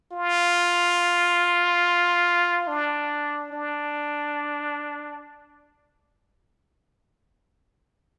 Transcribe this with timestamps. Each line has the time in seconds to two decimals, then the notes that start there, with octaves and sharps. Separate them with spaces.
0.12 F4
2.68 D4
3.52 D4